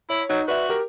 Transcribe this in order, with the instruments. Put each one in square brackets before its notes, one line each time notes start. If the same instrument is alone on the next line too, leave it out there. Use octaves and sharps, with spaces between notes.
[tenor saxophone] E4 [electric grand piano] C#5
[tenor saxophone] F#3 [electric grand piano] D#4
[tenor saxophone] F#4 [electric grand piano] B4 D5 E5
[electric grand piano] G4 A#4